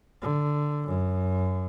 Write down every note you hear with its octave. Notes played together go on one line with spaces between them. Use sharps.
D3
F#2